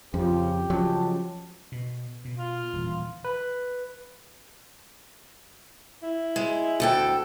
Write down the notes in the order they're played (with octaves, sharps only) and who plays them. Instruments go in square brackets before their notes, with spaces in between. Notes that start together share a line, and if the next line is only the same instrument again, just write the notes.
[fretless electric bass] F2 [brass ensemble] C#3 F3 [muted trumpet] G4
[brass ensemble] C#3 G#3 A5 [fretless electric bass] F3 F#3
[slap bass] B2
B2
[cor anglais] F4
[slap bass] D#1 E3
[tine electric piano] B4
[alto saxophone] E4
[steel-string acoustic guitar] G#3
D2 A4 G5